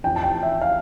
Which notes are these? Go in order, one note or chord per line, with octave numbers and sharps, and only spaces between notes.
F2 E3 G5
A5
G5
E5
F5